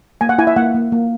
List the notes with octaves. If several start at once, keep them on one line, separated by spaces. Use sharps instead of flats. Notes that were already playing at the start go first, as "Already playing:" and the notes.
A#3 G#5
F#5
E4 G#5
E5
A#3 F#5
A#3
A#3